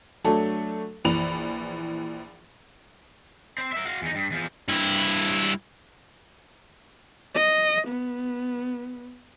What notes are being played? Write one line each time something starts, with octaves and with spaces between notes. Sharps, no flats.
F#3 A3 D4 A4
A#1 E3 B5 F7
C4
A#4 E5
F#4 F5
E2 D#4
G2
E2 F3
G2 E4
D#5
B3